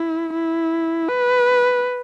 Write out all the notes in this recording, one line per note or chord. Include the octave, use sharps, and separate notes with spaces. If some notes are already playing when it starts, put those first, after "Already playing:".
Already playing: E4
E4
B4